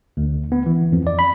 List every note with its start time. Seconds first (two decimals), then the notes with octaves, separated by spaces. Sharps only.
0.17 D2
0.52 B3
0.66 E3
0.93 F2
1.07 D5
1.19 B5